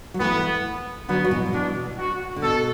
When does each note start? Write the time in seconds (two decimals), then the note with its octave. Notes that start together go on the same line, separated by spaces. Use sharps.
0.14 F#3
0.20 E3 A3 B3
1.09 D3 F#3 B3
1.24 F#3
1.31 B2 E3
1.46 F#3
1.53 B2 E3 D4
1.98 F#4
2.36 D3
2.42 B2 A4